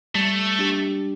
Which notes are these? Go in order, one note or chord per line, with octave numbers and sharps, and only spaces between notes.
G3 A3
D4 G4